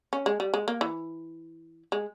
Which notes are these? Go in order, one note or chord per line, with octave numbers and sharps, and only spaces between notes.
C#4
G#3
G3
G#3
A#3
E3
G#3